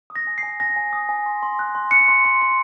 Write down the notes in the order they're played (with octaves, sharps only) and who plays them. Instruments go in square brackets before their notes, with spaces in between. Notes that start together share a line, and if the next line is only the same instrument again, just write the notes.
[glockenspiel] D#6
A#6
G#5
C7
G#5
G#5 A#6
G#5
D#6
G#5
C6
C6
F#6
C6
F#6 C#7
C6
C6
C6